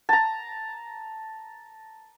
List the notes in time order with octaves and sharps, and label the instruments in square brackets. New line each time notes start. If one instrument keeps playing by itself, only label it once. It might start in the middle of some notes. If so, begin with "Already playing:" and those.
[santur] A5 A#5